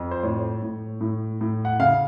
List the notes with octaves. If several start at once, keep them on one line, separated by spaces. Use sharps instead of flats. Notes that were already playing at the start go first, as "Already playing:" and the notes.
Already playing: F2
C5
A2 C#5
A2
A2
A2
F#5
C#3 F5